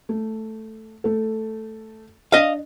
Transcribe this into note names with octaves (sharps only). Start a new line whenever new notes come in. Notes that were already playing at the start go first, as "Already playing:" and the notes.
A3
A3 A4
D4 D#5 F5